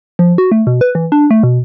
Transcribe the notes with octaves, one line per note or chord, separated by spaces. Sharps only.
F3
F#4
A3
B2
B4
E3
D4
A3
B2